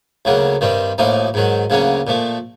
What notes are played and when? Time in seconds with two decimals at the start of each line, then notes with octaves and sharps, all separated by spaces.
0.25 D2 C#3 F#3 A#3
0.61 G2 D#3 G3 C4
0.98 A1 A2 F3 A#3 D#4
1.34 G#2 D#3 F#3
1.70 D2 C#3 F#3 A#3 C#4
2.07 A#2 F3 A3